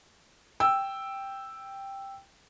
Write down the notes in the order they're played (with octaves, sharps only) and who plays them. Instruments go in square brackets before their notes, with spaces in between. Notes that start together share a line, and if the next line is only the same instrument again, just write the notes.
[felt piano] G5 E6